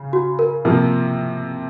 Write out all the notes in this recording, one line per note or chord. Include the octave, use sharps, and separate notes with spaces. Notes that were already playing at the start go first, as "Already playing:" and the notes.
Already playing: C#3
F#4
A#4
C3 F3 A#3